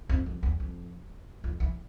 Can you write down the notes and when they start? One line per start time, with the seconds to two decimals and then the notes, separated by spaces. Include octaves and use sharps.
0.09 F2
0.26 F2
0.43 E2
0.60 F2
1.44 F2
1.60 E3